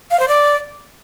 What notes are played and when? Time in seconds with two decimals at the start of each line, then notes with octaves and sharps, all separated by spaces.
0.11 F5
0.20 C5
0.28 D5